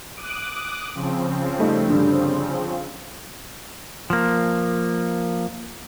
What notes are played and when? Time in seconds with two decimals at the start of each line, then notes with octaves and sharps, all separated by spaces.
0.15 D6 D#6 F#6
0.94 C#3 F3 C4
1.58 G3 A3 D#4
1.88 G2 D3 G3
4.10 F3 A#3